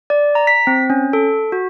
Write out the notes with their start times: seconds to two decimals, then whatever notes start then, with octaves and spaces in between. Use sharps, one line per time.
0.10 D5
0.35 A#5
0.47 B6
0.67 C4
0.90 C#4
1.13 A4
1.52 F#4